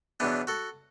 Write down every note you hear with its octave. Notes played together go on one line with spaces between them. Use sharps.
E2 B2 F#3 B3 D4
F#4 A4